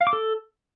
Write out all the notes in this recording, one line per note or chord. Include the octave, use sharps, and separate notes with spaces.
F5
D6
A4